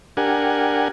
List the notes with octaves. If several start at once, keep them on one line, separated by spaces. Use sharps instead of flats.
D4 G4 A#4 F#5 G#5